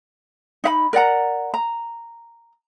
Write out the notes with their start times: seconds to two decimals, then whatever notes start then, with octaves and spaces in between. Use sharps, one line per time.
0.64 D#4 E5 B5
0.93 A#4 D5 F#5 A#5
1.54 A#5